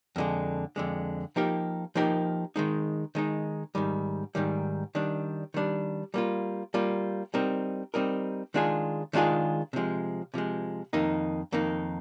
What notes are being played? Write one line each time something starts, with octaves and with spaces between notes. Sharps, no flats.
F2 D3 G#3
F2 D3 G#3
F3 A#3 D#4 G4 A#4
F3 A#3 D#4 G4 A#4
D#3 G#3 D#4
D#3 G#3 D#4
G#2 D#3 G3
G#2 D#3 G3
D#3 G3 D4
D#3 G3 D4
G3 A#3 F4
G3 A#3 F4
G3 C4 D#4 A#4
G3 C4 D#4 A#4
D#3 G#3 D4 F4 G#4
D#3 G#3 D4 F4 G#4
C3 F3 G#3
C3 F3 G#3
F2 D#3 A#3 D#4
F2 D#3 A#3 D#4